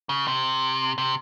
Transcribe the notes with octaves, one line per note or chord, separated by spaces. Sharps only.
C#3
C3
C3